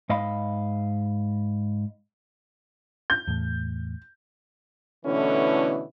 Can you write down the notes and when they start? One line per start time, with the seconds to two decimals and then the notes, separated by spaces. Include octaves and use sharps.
0.10 G#2 D#5 F5 B5
3.10 G6
3.27 E2 A2
5.06 B2 D3 E3 A3 C#4 E4